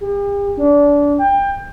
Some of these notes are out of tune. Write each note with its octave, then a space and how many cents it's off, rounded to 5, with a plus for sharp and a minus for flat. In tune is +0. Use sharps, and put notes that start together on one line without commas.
G4 +45
D4 -25
G5 +25